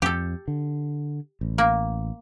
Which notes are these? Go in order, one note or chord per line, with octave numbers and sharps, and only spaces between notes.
F2 G4 A4
D3
A1
A#3